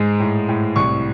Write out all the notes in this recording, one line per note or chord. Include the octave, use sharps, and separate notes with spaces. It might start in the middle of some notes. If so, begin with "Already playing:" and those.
Already playing: G#2 G#3
A2
A2
C2 C#6